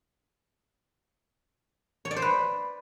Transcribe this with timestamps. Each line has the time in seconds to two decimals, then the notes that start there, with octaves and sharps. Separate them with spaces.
2.05 C#5
2.11 D5
2.16 C5
2.22 B4